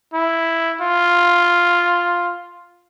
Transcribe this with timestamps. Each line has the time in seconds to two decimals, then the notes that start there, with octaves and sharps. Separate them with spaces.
0.14 E4
0.81 F4